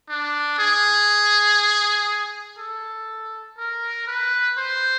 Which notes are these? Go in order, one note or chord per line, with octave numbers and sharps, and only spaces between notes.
D4
G#4
A4
A#4
B4
C5